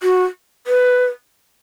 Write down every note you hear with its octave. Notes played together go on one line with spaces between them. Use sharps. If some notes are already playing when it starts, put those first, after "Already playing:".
F#4
B4